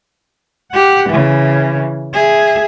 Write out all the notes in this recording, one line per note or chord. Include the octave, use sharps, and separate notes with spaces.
G4 F#5
C#3 E3
G#4 E5